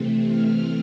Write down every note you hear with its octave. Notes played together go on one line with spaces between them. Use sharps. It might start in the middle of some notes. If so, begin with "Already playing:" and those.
Already playing: C3 E3 A3 C4
F6